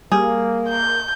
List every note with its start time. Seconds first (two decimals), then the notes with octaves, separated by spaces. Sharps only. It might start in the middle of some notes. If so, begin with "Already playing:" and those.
0.12 G3 A#3 G#4
0.69 G6